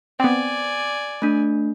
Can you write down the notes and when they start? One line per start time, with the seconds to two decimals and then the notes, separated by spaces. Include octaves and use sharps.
0.20 B3 C4 D5 G#5
1.22 A3 D4